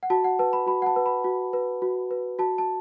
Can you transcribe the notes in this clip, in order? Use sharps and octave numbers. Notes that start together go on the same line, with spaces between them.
F#5
F#4 A5
F#5
B4 A5
B5
F#4 B5
F#5
A5
B4
B5
F#4
B4
F#4
B4
F#4 A5
A5